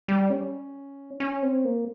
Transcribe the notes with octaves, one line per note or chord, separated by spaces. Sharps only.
G3
C#4
C#4
C4
A#3